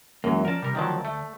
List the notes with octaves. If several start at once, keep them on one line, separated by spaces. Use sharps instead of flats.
F#2 E3 G#3 A#3
F3 C#4 A#4 D5 A5
C3 G3 A#4
D2 D#3 F3 F#3 D5 A5
A3